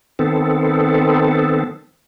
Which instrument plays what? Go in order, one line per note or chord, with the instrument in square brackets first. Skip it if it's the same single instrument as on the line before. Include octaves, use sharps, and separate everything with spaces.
[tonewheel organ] D#3 B3 C4 A4